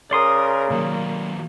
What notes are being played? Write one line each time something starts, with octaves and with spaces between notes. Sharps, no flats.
C#3 A#4 D5 C6 D#6
D#3 F#3 A#3